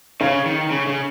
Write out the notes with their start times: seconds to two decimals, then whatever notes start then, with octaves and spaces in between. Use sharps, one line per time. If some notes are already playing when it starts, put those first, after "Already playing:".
0.21 C#3 C#5 F5
0.46 D#3
0.71 C#3
0.87 C#3